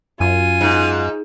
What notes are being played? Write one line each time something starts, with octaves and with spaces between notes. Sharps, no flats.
F#2 F4 G#5
G#2